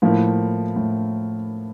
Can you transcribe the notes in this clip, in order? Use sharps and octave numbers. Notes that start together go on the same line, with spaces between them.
A2 F3 A#3 E4 A#4
A2